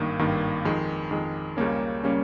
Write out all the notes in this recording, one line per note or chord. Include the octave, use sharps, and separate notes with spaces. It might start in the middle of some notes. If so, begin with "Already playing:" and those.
Already playing: G#1 G2 D#3 A#3
G#1 G2 D#3 A#3
F2 D#3 G#3
F2 D#3 G#3
C#2 C#3 G3 A#3 C#4
C#3 G3 A#3 C#4